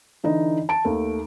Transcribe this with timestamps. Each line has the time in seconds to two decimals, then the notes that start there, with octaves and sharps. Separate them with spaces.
0.24 D3 E3 D#4
0.69 A5 D7
0.85 D#2 A3